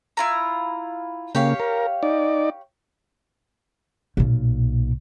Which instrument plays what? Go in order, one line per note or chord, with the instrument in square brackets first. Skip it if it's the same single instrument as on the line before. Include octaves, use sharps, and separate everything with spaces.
[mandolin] E4 F4 A#5
[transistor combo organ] C#3 A#3 [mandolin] G4 C#5 F5
[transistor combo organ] A#4
D#4 D5
[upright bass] B1 A#2